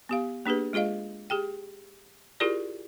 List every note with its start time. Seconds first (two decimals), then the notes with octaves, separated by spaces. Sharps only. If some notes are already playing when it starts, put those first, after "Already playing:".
0.09 B3 G4 F5
0.46 A#3 D4 G4 G#4 B4
0.73 G#3 F4 G#4 D#5 F5
1.30 G4 G#4 G5
2.40 E4 F4 G4 G#4 A#4 D5